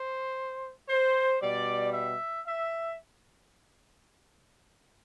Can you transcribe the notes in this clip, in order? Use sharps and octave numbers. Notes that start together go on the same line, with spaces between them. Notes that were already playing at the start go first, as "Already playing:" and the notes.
Already playing: C5
C5
B2 G3 D5
E5
E5